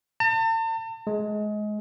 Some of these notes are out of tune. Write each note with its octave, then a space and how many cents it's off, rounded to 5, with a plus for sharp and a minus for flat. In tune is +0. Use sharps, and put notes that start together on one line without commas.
A5 +40
G#3 +25